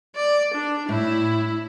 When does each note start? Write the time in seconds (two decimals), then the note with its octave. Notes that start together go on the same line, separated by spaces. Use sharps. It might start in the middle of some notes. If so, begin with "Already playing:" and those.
0.16 D5
0.54 D4
0.89 A2 E4